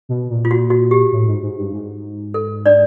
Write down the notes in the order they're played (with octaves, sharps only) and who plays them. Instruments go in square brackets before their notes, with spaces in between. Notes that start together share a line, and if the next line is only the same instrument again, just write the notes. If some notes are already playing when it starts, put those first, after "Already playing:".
[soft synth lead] B2
A#2
[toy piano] F4
F#4
F#4
G4
[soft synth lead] A2
G#2
G#2
G2
G#2
[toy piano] A4
D4 D5